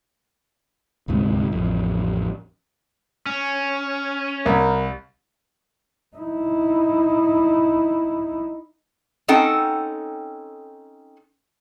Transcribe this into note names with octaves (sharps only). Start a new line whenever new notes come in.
D#1 D2 G#2 C3
A1 F2
C#4
C2 A#4
D#4 E4
C4 C#4 D#4 A4 F#5 G5